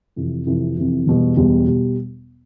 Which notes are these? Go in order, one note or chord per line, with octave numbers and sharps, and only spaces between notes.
F2 C3 E3
F2 C3 E3
F2 C3 E3
E1 E2 B2 G3
E1 E2 B2 G3
B2 G3